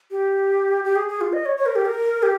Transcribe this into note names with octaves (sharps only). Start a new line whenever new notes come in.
G4
G4
G#4
G#4
F4
D#5
C#5
C#5
A#4
G4
A#4
G4